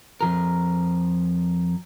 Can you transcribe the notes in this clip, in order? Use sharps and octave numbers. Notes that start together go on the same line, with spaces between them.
F2 F3 A#4